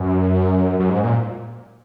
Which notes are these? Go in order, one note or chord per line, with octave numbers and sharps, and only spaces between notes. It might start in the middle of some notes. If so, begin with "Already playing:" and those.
Already playing: F#2
F#2
G#2
A#2